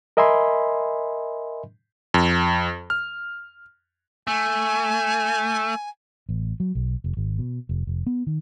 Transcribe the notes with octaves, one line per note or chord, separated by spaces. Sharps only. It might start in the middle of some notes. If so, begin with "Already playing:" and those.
A#4 D#5 E5 G#5 B5 C6
F2
F6
A3 G#5
A1
F#3
B1
F1
G#1
B2
F1
F1
B3
D#3